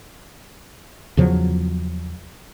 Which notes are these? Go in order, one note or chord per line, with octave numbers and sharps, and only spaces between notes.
E2 C#3 F3 F#3